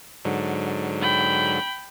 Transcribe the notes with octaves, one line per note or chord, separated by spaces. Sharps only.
G#2 D3 F#3
G5 B5